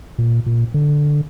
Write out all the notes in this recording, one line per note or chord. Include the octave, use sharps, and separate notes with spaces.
A#2
A#2
D3